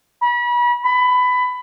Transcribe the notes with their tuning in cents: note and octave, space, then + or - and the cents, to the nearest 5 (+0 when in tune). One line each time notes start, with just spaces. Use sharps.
B5 -35
B5 +20